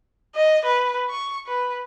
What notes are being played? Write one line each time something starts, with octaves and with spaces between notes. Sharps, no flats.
D#5
B4
C#6
B4